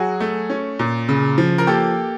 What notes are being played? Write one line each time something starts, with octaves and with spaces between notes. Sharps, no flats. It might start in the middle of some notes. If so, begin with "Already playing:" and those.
Already playing: F#3 F#4 G#4
A3
C#4
A#2
C#3
F3
A#4
A#3 G4 A4